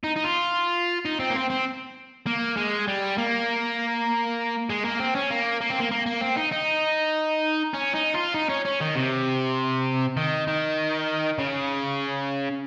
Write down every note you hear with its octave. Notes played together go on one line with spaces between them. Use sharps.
D#4
D#4
F4
D#4
C4
A#3
C4
C4
A#3
G#3
G3
A#3
G#3
A#3
C4
C#4
A#3
A#3
C4
A#3
A#3
A#3
C4
D#4
D#4
C#4
D#4
F4
D#4
C#4
C#4
D#3
C3
D#3
D#3
C#3